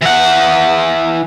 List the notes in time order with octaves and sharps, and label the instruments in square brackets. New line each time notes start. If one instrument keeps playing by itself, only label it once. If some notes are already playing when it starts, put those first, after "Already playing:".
[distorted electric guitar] E3 F#5